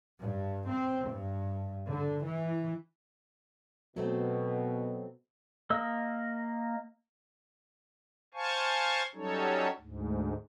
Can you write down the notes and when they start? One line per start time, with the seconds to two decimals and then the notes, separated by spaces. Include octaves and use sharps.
0.19 G2
0.70 C4
1.09 G2
1.87 D3
2.24 E3
3.96 B2 F#3 A3 C4
5.70 A#3 D#5 E6
8.34 C5 F5 G#5 A5 C#6
9.15 F#3 G3 C#4 D#4 A4 C#5
9.80 D2 G#2